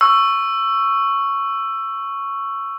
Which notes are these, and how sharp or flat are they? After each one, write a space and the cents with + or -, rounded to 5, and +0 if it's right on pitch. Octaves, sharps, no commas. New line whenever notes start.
C#6 +0 E6 +15